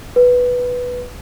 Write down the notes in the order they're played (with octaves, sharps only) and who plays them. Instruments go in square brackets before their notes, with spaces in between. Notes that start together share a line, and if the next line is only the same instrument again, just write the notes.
[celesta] B4